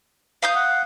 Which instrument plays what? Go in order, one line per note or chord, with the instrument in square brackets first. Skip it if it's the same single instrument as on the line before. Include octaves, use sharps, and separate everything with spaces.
[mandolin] F5 D#6 G6
[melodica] F#5